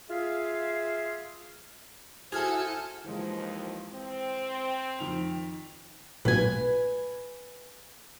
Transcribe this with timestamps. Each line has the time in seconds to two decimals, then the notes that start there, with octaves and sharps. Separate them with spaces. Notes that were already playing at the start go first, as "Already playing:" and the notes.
0.09 F4 G#4 E5 F5
2.32 E4 F#4 G#4 A4 C5 G#5 F6 G#6
3.04 D#2 E3 F3 G#3
3.91 C4
4.99 F2 D#3 F7
6.25 B1 A#2 F#3 B4 G#5